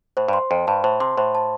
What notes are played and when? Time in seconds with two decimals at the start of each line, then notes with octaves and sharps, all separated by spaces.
0.17 A2 C5
0.28 G2 C6
0.51 F2 C5
0.67 G2 A5
0.84 A2 C5
1.00 C3 C6
1.17 A2 C5
1.35 A5